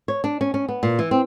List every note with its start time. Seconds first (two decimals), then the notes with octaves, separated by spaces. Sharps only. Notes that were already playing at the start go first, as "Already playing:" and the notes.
0.08 C#5
0.24 D4
0.41 C#4
0.54 C#4
0.69 B3
0.83 A#2
0.99 E3
1.11 C4